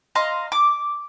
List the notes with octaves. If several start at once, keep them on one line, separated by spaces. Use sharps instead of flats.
D#5 F5 A#5 C6
D6